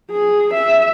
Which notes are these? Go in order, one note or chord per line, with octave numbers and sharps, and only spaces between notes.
G#4
E5